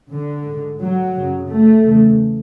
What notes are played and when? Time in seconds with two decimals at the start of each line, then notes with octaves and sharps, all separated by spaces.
0.11 D3
0.46 G#2
0.80 F#3
1.15 F#2 C#3
1.49 A3
1.83 E2 C#3